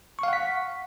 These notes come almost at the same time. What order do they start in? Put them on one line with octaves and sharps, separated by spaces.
C#6 F5 F#5 B6